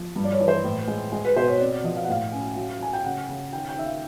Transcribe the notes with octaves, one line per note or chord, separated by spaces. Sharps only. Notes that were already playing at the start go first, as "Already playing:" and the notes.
Already playing: F3
G2
D5
C#5
E3
C5
A2
G#3
G#3
B4
B2 C5
C#5
C4 D5
D5
F3 D#5
F5
F#5
A2 F5
C#4
F#3
F#3 G#5
G5
C#3 F#5
C#3
D#3 G5
G5
D#3 E5
F5